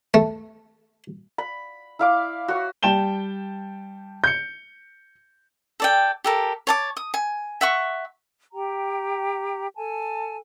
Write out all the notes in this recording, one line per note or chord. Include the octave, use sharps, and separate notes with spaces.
A3
B5
E4 F5 D6
F#4 C#5
G3 G5 A5 E7 G7
G6 C#7
A4 D5 G5
G4 A4 A#4
C#5 A5 D6
D#6
G#5
E5 F#5 C#6
G4 G5 A#5
A4 G#5 A5